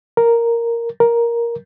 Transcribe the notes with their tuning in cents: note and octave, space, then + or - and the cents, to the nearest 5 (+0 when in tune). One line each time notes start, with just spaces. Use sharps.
A#4 +0
A#4 +10